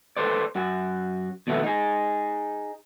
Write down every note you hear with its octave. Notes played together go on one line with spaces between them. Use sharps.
A4 B4 C5 D5
F#2 F#4
D#2 B2 F3 A3 B3
D#4 G#4